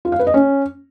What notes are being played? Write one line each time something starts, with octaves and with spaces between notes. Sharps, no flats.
F4
F5
B4
D#5
C#4